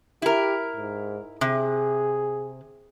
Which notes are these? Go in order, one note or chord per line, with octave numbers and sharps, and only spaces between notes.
E4 G4 A#4
G#2
C3 G#4